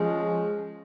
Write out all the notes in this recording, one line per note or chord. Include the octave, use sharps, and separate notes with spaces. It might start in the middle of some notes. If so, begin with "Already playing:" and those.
Already playing: F3 G#3 C#4